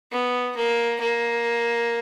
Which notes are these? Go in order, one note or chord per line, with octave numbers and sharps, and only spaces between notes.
B3
A#3
A#3